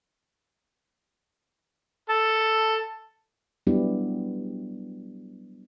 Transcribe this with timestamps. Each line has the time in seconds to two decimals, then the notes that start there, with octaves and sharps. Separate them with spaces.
2.10 A4
3.67 F#3 G3 B3 D4 E4 G4